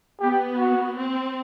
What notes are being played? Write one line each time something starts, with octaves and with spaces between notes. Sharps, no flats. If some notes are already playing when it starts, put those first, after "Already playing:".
B3 G4
F#4
C4